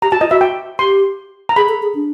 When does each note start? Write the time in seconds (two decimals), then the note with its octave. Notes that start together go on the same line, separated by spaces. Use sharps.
0.02 G4 A#5
0.11 F#4 A5
0.21 F4 D#5
0.31 F#4 E5
0.41 G5
0.79 G4 C6
1.49 A#5
1.56 G#4 B5
1.69 A4
1.83 G#4
1.95 D4